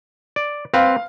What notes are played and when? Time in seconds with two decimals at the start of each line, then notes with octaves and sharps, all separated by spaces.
0.36 D5
0.74 C4 B4 F5